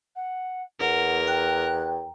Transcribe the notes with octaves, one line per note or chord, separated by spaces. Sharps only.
F#5
E2 A#4 F#5
G5 A#5 F#6